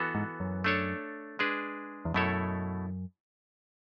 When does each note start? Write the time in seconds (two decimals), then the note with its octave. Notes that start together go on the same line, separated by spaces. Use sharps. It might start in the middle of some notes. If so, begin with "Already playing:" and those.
Already playing: E3 B3 F#4 A4
0.15 G#2
0.40 F#2
0.64 A3 D4 A4 C#5
1.39 G#3 D4 G#4 B4
2.05 E2
2.14 F#2 B2 A3 E4 A4 C#5